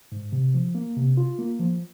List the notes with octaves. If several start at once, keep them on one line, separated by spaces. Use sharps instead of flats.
G#2
C3
F3
A#3
C3
F4
A#3
F3